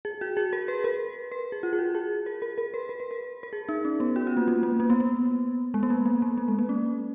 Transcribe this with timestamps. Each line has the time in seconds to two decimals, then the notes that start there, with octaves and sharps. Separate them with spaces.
0.05 G#4
0.21 F#4
0.37 G#4
0.53 A#4
0.68 B4
0.84 A#4
1.32 B4
1.52 G#4
1.63 F4
1.73 G#4
1.79 F#4
1.95 G#4
2.26 A#4
2.42 A#4
2.58 A#4
2.74 B4
2.89 A#4
3.00 B4
3.11 A#4
3.43 A#4
3.53 G#4
3.69 D#4
3.85 C#4
4.00 B3
4.16 F#4
4.27 F4
4.37 A#3
4.48 A#3
4.63 A#3
4.80 A#3
4.90 B3
5.00 B3
5.74 G#3
5.83 B3
5.90 A#3
6.06 A#3
6.22 G#3
6.38 A#3
6.48 G#3
6.59 A#3
6.69 C#4